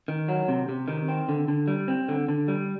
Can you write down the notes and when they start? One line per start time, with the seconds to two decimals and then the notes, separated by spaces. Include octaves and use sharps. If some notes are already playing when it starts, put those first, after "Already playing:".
0.08 D#3
0.28 F#3
0.48 C3
0.69 C3
0.88 D#3
1.08 C4
1.29 D3
1.48 D3
1.68 G3
1.88 C4
2.09 D3
2.28 D3
2.48 G3